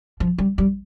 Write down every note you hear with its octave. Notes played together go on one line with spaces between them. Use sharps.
F3
G3
G3